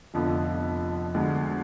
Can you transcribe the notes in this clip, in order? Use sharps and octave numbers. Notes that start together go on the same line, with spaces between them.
F1 F2 D3 F3 B3
D2 D3 G#3 B3